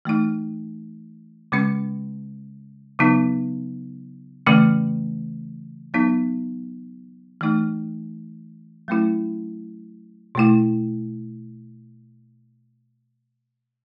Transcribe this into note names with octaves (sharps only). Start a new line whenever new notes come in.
E3 A3 D#4
C#3 G#3 C#4
C#3 F#3 B3 D#4
C#3 E3 A3 C#4
F#3 B3 D#4
E3 A3 D#4
F#3 A3 C#4 E4
B2 A3 E4